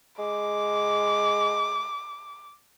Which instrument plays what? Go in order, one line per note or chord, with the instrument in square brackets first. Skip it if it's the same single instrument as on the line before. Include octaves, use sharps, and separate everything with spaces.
[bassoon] G#3 [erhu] D6